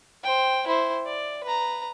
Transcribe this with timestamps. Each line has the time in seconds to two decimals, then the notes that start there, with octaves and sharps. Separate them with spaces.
0.23 C5 G5
0.67 E4 C5
1.06 D5
1.44 B4 A#5